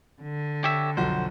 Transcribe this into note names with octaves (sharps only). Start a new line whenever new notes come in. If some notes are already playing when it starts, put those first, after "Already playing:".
D3
G4 C#5 E5
B1 F2 F#4 C5